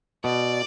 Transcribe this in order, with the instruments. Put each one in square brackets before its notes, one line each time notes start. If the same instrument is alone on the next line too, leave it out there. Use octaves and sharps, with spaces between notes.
[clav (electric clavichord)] B2 [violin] D5